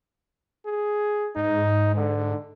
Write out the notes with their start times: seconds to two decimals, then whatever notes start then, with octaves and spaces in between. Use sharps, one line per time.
0.66 G#4
1.36 G#2 D#4
1.95 D3